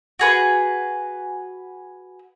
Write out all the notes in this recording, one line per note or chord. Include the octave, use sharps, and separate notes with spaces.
F#4 G#4 B4